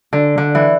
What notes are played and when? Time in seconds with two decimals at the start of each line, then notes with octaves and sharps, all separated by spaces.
0.13 D3
0.38 D3
0.55 E3